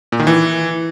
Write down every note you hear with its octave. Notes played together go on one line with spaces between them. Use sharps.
A#2
D#3
E3